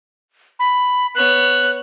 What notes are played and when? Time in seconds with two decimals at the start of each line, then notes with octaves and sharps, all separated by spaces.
0.59 B5
1.15 B3 C#5 F#6